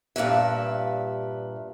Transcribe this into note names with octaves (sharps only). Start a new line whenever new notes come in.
G2 A#2 B4 E5